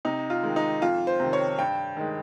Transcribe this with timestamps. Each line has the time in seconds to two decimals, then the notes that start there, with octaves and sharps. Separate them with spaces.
0.05 C3 D#4
0.30 F4
0.43 D#3 G#3
0.56 D#4
0.81 F2 F4
1.07 C5
1.20 C3 D#3
1.33 C#5
1.58 G2 G5
1.97 D#3 G#3